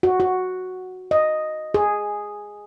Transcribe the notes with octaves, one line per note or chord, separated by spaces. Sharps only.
F#4
F#4
D#5
G#4